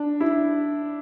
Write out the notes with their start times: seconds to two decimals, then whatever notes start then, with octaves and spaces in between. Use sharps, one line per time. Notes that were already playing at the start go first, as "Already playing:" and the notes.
Already playing: D4
0.21 E4